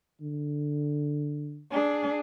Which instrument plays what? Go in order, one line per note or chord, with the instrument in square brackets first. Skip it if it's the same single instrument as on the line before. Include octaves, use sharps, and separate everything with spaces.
[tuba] D3
[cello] D4 G#4